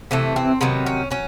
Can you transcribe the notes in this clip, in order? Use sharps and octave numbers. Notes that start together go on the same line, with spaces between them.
C3 E3 A3
C4
C3 D#3 F#3 B3
C#4
F#3 C#4